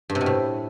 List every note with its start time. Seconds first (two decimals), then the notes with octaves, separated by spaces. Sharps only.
0.10 G2
0.15 C3
0.21 B2
0.26 A2